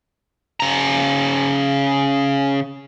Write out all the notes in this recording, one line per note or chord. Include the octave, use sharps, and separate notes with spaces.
C#3 A#5